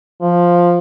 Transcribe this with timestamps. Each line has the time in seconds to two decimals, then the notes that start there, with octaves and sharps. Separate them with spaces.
0.22 F3